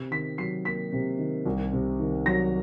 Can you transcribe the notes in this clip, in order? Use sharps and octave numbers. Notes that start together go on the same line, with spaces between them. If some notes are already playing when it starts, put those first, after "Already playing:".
Already playing: C3
D#3 B6
F#3 C7
A#3 B6
C3
D#3
C2
C3
D#3
F#3 A#6